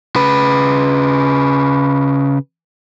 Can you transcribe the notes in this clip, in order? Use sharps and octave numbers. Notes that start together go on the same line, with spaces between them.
C#3 B4